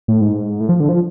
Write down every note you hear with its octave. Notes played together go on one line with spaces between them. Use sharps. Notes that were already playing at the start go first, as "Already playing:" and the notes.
A2
G#2
A2
F3
D3
F3